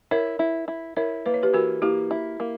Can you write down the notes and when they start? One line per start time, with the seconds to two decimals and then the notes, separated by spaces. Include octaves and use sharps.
0.11 E4 A#4 C#5
0.39 E4
0.68 E4
0.96 E4 A#4 C#5
1.26 A#3 B4
1.34 C#5
1.43 G4 B4
1.54 E3 F#4 A#4
1.82 A#3 E4 G4
2.11 E4
2.40 A#3